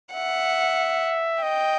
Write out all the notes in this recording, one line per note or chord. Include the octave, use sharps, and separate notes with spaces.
E5 F#5
D#5 G5